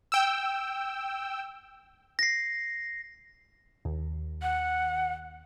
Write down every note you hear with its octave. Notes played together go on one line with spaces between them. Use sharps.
G5 E6
A#6 C7
D#2
F#5